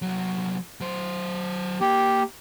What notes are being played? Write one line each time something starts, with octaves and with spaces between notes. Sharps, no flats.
C2 F#3
F#3 C5
A#3 G4